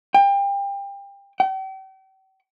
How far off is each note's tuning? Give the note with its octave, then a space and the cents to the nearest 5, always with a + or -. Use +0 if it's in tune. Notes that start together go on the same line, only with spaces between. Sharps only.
G5 +30
G5 -40